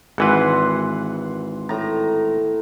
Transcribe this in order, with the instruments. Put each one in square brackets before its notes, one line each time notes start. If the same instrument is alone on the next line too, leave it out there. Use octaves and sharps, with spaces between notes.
[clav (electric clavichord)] G#1 E3 B4 [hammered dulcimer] F#5 C6
[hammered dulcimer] A2 A#5